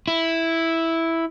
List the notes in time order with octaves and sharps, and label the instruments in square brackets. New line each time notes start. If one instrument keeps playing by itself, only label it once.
[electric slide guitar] E4